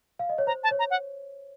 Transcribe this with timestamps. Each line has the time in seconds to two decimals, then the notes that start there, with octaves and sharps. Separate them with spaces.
0.19 F5
0.29 D#5
0.38 C#5
0.47 C5 A#5
0.64 A5
0.71 C#5
0.79 A#5
0.91 F#5